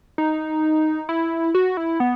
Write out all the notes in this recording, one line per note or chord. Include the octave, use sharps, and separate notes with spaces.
D#4
E4
F#4
E4
B3